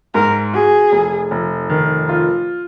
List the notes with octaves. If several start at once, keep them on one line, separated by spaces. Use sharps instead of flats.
G#2 A#4
F#4 G#4
F1
F1
D#3
F4